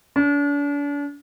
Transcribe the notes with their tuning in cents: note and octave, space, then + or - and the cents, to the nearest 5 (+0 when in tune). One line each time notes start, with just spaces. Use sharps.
D4 -40